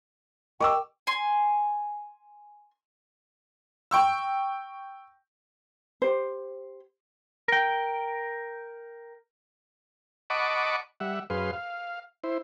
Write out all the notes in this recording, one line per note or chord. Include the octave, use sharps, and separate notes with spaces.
A#4 D#5 G5 C#6 D6 E6
G#5 C6
G5 C#6 E6
G4 C5
A#4 G5
D#5 F#5 A5 B5 C#6 D6
G3 E5 F#5
F#2 G#4 B4 F5 C6
F5
E4 C5